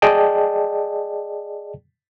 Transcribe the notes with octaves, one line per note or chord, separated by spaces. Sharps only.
G#4 D5 D#5 G5 A5